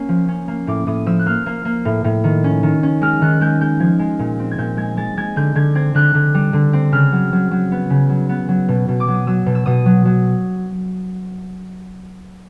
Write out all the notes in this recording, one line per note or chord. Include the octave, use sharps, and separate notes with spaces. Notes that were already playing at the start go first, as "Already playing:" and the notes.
Already playing: A#3 C#4
F3
C#4
A#3
A2 D6
A2 D#6
F3 E6
F#6
A#3 F6
A#3
A#3
A2
A2
D#3
C#4
D#3
C#4
G#3 F6
D#3 F#6
G#3 G6
G#3 G6
F3 G#6
G#3
A#2
C4
G#6
A#2 G6
G#3 G#6
G#3 A6
G#3 G#6
D3 G6
D3 G#6
C4 G#6
D3 F#6
D3
G3
D3
C4
C#3 F6
F#3
F#3
F#3
B3
C#3
F#3
B3
F#3
B2
B2
D6
F#3
D#6
F#3 E6
B2
E6
B2 D#6
F#3
F#3